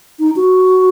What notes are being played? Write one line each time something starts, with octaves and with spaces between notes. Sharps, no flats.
D#4
F#4